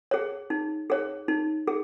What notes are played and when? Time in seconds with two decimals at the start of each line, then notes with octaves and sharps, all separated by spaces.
0.11 G#4 C#5
0.50 D#4
0.90 G#4 C#5
1.28 D#4
1.67 G#4